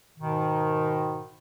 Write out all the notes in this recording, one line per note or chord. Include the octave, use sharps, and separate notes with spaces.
G#2 B2 D#3